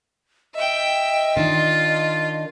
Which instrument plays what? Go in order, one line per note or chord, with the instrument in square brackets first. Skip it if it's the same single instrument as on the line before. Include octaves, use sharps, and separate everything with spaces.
[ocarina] D#5 [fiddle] E5 G5
[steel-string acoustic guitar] D#3 D4 [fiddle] F4